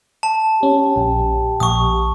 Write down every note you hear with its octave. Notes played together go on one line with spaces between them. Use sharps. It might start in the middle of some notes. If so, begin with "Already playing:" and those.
A5
C#4 G4
A#1
A#1 C#6 D#6